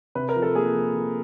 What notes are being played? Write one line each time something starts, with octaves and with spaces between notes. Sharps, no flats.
C3 B4
A#4
F3
A4
A#3 G#4
F3
F3